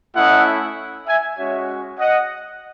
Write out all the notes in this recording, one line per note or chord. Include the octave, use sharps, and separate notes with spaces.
A3 C#4 E4 D#5 F#5
E5 G#5
G#3 C#4 F#4 C#5 E5
D#5 F#5